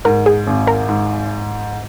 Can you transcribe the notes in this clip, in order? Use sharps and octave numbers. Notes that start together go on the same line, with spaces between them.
G#2 A#4
G#4
G#1
A#4
G#2